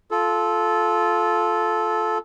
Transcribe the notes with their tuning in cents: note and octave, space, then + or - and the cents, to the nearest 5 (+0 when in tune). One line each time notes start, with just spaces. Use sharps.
F4 +0 A4 -15